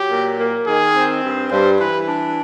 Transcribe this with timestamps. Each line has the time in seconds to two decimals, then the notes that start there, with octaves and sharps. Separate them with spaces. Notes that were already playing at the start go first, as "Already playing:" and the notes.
Already playing: F#3 G4
0.10 A#2
0.38 A#3
0.67 D#3 G#4
0.94 C4
1.23 G2
1.51 G2 C5
1.79 E3 B4
2.08 D4